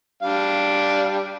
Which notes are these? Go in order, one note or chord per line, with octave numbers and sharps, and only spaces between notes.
G3 D4 F5